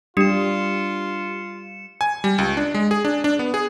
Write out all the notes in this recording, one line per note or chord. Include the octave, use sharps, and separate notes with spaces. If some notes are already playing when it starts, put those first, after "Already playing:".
G3 D4 F4 G4 C#7 E7
G#5
G3
C#2
D4
G#3
G#4
D4
D4
B3
G#4